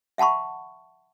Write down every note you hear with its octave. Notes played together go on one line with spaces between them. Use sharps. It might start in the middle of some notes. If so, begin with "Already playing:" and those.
E5 F#5 A5 B5 C#6